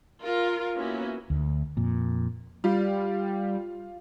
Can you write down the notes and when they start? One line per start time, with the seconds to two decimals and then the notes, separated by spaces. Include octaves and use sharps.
0.23 F4 A#4
0.75 A#3 B3 C#4 E4 F#4
1.30 D2
1.77 F2 A#2
2.64 G3 F4